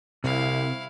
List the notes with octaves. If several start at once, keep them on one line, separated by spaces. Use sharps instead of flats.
C2 C3 E4 F5